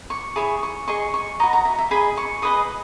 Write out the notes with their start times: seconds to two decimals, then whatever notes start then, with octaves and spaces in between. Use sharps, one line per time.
0.10 C#6
0.36 E4 G#4 C#5 C#6
0.63 C#6
0.88 G#4 D#5 C#6
1.14 C#6
1.40 F#4 B4 D#5 A#5
1.53 A#5
1.65 E5
1.78 E5
1.91 G#4 D#5 B5
2.17 C#6
2.42 G#4 B4 D#5 D#6